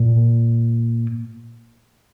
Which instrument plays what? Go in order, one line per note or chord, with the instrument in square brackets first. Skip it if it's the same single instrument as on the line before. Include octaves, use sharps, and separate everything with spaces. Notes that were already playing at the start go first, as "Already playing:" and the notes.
Already playing: [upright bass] A#2